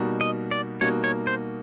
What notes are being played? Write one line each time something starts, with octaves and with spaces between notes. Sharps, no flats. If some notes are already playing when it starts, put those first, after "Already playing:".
Already playing: B2 G3 A#3 D#4 F#4
D#5
D5
B2 G3 A#3 D#4 F#4 C#5
C#5
C5